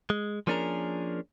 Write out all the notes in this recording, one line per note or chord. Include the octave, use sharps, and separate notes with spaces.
G#3
F3 A#3 C#4 D4 G#4 A#4